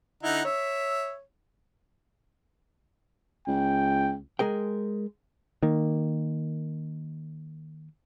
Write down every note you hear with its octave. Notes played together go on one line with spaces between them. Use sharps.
D3 D#4 E4 F#5
C#5 E5
C#2 G5
G#3 G#4 A#4 G5
D#3 A#3